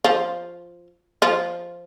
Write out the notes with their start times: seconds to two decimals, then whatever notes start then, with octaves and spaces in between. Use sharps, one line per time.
0.04 F3 F4
1.22 F3 F4